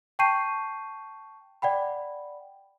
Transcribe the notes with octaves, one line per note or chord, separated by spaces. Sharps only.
G5 A5 C#6 G6 C7 D#7
D5 F#5 G5 B5